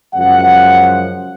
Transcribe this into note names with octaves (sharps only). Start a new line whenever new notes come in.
F#2 C#3 F3 G#3 F#5